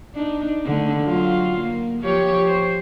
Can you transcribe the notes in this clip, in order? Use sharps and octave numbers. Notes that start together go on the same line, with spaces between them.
D4 D#4
D3 A3
F#3 F4
A#3
F3 G4 C#5
C5